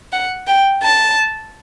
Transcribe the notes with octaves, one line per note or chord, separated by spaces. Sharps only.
F#5
G5
A5